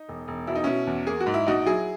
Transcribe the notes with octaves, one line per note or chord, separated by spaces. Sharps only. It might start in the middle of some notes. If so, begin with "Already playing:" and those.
Already playing: D#4
E1
E1
B2 E4
D#4
B2 C#4 E4
E2
A#3 G#4
F#4
G#2
E4
A#1 D#4 F#4
F#3 E4 G#4